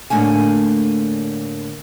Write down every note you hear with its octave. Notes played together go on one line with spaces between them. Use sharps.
A2 D3 A3 A#3 G#5